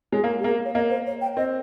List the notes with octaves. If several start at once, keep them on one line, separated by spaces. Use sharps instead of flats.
G#3 C#5
A#3
G#4
G4
A#3 G#4
C#5
A#3 D#5
C5
C#5
G5
C4 D#5